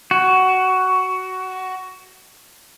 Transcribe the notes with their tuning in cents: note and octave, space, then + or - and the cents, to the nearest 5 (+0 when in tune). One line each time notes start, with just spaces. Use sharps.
F#4 +15